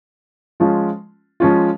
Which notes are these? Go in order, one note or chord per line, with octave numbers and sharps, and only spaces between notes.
F3 G#3 C#4 F4
F3 G#3 C#4 F4